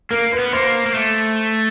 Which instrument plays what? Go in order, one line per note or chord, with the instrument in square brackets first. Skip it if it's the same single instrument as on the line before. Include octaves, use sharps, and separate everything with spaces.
[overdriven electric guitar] A#3 [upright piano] A#4
[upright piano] B4
[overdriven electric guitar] B3
[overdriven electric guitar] A#3 [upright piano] C5
[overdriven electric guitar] A#3
A3